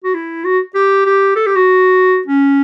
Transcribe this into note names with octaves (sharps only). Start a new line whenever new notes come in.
F#4
E4
F#4
G4
G4
A4
G4
F#4
C#4